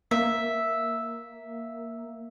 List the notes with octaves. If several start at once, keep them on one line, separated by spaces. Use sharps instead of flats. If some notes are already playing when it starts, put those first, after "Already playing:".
A#3 E5